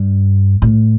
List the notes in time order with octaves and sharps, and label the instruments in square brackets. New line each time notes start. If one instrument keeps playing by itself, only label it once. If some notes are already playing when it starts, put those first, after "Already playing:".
Already playing: [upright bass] G2
A2